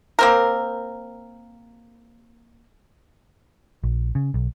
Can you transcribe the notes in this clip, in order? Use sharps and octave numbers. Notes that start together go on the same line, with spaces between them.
A#3 C4 A#4
A#1
C#3
B1